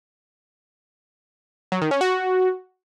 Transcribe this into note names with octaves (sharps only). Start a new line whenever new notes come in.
F#3
D#3
C#4
F#4